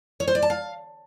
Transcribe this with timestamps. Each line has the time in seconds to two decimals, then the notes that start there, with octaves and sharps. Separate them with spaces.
0.20 C#5
0.28 C5
0.35 D5
0.42 A5
0.50 F5